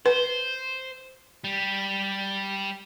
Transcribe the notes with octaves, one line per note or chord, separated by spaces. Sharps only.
B4 C5
G3